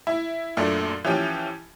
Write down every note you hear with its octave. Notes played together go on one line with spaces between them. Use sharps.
E4
F#2 A#2 A3 D4
E3 F3 C#4 G4